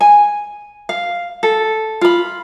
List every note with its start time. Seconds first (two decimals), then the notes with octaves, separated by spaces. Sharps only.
0.01 G#5
0.89 F5
1.43 A4
2.01 F4 B5